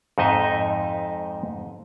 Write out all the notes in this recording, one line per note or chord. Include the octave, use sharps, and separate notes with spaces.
F2 G#2 D#4 D#5 E5